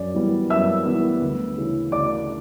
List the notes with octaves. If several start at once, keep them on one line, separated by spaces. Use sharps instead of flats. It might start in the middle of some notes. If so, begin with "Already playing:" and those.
Already playing: F#2 D5
E3 G3 B3
F#2 E5 E6
E3 G3 B3
D2
C#3 E3
D2 D5 D6